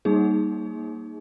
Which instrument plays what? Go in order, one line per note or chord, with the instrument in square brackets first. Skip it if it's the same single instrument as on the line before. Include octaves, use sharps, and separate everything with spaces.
[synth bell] G3 A#3 D#4 G#4